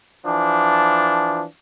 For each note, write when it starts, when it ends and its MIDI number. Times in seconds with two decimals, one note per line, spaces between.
0.24 1.44 52
0.24 1.44 53
0.24 1.44 62